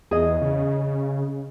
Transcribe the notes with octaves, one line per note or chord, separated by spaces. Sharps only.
E2 G#4 D#5
C#3